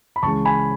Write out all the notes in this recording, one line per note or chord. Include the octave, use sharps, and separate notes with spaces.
B5
C#2 C#3 E3 G#3 A5 C#6
G#5 B5